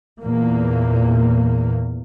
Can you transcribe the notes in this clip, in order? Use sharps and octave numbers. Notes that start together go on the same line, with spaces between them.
E2 A#2 A#3